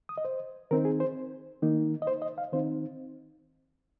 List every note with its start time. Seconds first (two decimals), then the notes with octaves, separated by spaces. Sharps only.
0.09 D#6
0.18 D#5
0.25 C5
0.71 D#3 C4 D#4 A#4
0.85 G#4
1.00 C5
1.62 D#3 A#3 D#4
2.02 D#5
2.07 C5
2.22 D#5
2.38 F5
2.52 D#3 C4 D#4 C5